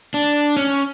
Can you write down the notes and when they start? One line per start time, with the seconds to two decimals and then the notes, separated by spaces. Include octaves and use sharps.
0.14 D4
0.57 C#4